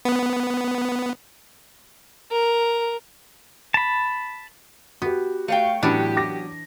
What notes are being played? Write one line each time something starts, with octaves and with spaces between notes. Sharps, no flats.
B3
A#4
A5 B5
B3 F#4 G4
A3 C#5 F5 G5
A2 E3 F#3 B3 C#4 D4 G4
D6 A#6